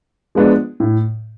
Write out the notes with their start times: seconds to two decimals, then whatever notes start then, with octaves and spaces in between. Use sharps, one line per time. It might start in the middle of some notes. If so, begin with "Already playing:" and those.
0.35 F3 G#3 B3 D4
0.80 A2